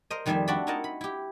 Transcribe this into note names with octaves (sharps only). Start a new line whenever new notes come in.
A#4 C5 D#5
F2 D#3 G3 A3 G#4 E5
C4 D4 F#4 A4 D5 B5
D#4 E4 A#4 D#5 F#5 A5
B5
E4 G4